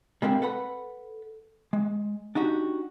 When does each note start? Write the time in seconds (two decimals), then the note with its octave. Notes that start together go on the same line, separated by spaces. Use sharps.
0.22 G3 G#3 A#3 C4 D4
0.42 A4 B4 F#5 B5
1.73 G#3
2.35 D4 D#4 F#4 G4